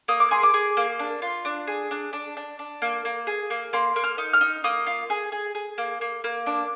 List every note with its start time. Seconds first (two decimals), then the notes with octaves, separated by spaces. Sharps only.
0.08 A#3 D#6
0.20 D6
0.31 G#4 C6
0.43 D6
0.54 G#4
0.77 A#3
0.99 D4
1.22 F4
1.45 D4
1.67 G#4
1.91 D4
2.13 D4
2.37 D4
2.59 D4
2.82 A#3
3.05 A#3
3.27 G#4
3.50 A#3
3.73 A#3 C6
3.96 A#3
4.04 F6
4.18 D#4
4.33 F6
4.41 D#4
4.64 A#3 D#6
4.87 F4
5.10 G#4
5.32 G#4
5.55 G#4
5.78 A#3
6.01 A#3
6.24 A#3
6.46 D4 D6